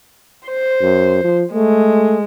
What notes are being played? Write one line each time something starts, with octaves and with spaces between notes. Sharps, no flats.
C5
F#2
F3
G#3 A3